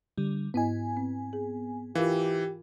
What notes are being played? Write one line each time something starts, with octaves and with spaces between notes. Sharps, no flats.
D3 G3
G#2 B3 E4 D#5 G#5
C4
G#4
E3 F4 G4 A#4 F5